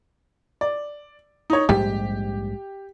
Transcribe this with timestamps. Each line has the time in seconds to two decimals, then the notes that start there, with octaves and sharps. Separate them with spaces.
0.61 D5
1.50 D#4 C#5
1.69 A#1 G#2 G3 G4